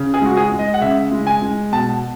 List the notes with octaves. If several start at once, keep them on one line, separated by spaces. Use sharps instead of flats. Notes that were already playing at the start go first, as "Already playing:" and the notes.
Already playing: C#3
G#4
G#3 F#4
G#4
G#3
D#5
F#5
C#3 E5
G#3
G#5
G#3
B2 A5